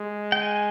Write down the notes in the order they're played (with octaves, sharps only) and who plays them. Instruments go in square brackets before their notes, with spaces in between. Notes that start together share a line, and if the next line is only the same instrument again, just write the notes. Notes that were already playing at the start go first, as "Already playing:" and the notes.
Already playing: [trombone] G#3
[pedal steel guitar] G5
G#5